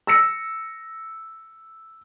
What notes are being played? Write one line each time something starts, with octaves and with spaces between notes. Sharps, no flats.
E6 A#6 C#7